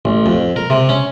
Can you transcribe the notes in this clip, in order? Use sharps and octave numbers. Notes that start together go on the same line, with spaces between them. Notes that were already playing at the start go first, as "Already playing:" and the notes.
A1
F2
A#4
C3
C#4